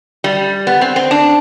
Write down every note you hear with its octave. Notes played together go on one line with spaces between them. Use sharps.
G3
B3
C4
C4
D4